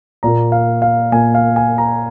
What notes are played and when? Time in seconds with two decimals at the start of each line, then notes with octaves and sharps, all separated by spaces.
0.23 A#2 A#3 A#5
0.52 F5
0.82 F5
1.12 A#2 A#3 G#5
1.35 F5
1.56 G#5
1.78 A#5